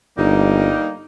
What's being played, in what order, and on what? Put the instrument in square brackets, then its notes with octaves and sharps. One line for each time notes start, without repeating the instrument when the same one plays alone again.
[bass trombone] G1 [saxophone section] G3 A#3 D#4